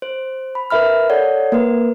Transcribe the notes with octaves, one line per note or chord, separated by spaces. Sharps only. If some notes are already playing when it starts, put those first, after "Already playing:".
C5
B5
A#4 B4 E5 B5 F6
A4 C#5 D5 F#5
A#3 A#4 B4